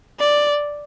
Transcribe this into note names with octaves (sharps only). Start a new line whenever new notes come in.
D5